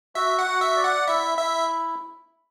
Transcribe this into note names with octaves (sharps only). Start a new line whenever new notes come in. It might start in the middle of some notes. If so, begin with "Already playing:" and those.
F#4 E5
F#5
F#4
E5
D5
F#5
E4 E5
E4 E5